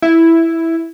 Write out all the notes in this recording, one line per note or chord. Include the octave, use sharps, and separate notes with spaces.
E4